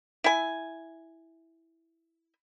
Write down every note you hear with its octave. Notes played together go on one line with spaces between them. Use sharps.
E4 G#5